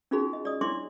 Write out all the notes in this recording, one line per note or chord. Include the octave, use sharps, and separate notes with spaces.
C#4 D#4 F4 F#4 G#4 B5
D#5
D5 D#6
D4 E4 C#5 C6 D6